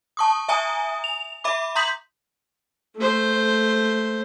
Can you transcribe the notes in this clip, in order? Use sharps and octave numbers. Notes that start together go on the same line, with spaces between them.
A5 C#6 D#6
E5 G#5 A#5 D#6
F7
E5 B5 D6
A#5 C6 D#6 G6 B6 F#7
A3 C5